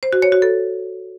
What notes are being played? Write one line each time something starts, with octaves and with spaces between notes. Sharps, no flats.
C5
F#4
C#5
F#4
A4